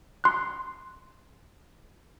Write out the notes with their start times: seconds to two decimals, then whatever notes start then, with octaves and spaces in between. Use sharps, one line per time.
0.24 C6 F#6